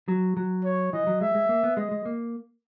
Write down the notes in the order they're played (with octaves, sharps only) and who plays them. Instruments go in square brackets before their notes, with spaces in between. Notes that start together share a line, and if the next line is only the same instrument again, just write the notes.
[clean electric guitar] F#3
F#3
[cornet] C#5
[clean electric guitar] E3 [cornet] D#5
[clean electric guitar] F#3
[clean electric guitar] G#3 [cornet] E5
[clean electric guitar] G#3
A#3
B3
[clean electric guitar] G#3 [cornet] D#5
[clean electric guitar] G#3
A#3